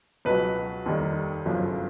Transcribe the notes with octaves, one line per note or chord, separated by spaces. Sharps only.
C#2 B2 F#3 B4
F1 D#2 D#3 G3
G1 F#2 C#3 F3